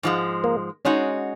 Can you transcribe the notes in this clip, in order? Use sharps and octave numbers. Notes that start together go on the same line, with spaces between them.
G#2 F3 G#3
A#3
G#3 C#4 D#4 F#4